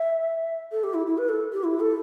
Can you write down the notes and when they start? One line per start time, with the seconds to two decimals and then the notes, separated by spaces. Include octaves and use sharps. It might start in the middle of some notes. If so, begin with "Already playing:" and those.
Already playing: E5
0.72 A4
0.84 G4
0.94 E4
1.07 E4
1.18 B4
1.29 A4
1.53 G4
1.64 E4
1.80 A4